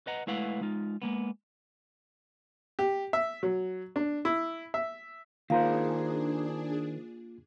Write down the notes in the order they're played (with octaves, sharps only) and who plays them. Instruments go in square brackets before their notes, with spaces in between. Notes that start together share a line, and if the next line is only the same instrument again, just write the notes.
[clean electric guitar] B4 D#5 F#5 A#5
G#3 A3 E4 B4 F5 F#5
G#3 D#4 F4
G#3 A#3 B3
[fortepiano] G4
E5
F#3
D4
E4
E5
[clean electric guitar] D#3 A#4 C5 [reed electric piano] A#3 F4 [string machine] D4 G#4 [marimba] F5